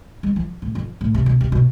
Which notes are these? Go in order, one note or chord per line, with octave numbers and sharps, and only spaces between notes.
G#3
F3
A2
F2
A2
C3
B2
C3
B2